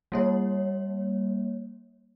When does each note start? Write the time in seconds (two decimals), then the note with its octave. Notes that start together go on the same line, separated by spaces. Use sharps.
0.12 G3 A#3 C#5